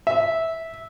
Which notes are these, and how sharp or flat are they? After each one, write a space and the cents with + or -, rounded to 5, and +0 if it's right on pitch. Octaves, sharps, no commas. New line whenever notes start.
E5 -15